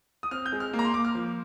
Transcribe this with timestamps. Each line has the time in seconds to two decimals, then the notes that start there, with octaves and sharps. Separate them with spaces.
0.23 D#6
0.31 C4 F6
0.46 G6
0.52 G#3
0.60 F6
0.73 A#3
0.79 A#5
0.85 C6
0.94 A#3 D6
1.05 F6
1.15 F3